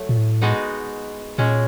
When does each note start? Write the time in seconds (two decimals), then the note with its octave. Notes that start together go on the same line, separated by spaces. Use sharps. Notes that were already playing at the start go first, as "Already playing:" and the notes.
Already playing: F#3 A3
0.09 A#2
0.17 A2
0.42 G#3 B3 D#4 F#4
1.38 A#2 G#3 C#4 F#4